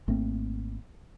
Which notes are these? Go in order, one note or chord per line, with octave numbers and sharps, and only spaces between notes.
G#1 A3 A#3 C4